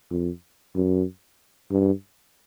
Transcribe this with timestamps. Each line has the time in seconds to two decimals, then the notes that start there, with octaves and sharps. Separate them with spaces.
0.10 F2
0.75 F#2
1.71 G2